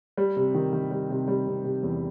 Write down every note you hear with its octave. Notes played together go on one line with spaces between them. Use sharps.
G3
C3
D#3
D#3
G3
C3
G3
C3
C3
E2